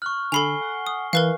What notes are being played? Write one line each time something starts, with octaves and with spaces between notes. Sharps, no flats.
C#6 F6 F#6
D3 A4 G#5 B5 C7 F7 G7
F#5
D#6
E3 A#4 B4 F5